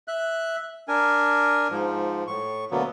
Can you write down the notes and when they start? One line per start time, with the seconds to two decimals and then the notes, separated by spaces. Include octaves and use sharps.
0.08 E5 F#6
0.88 D4 A#4 G#5
1.70 G#2 F3
2.27 A2 C#6
2.71 D2 B2 D3 F#3 A#3 B3